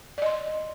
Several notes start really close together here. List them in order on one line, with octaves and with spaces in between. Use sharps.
D5 D#5 C6